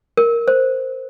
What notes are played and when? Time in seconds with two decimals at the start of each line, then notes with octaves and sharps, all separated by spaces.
0.17 A#4
0.48 C5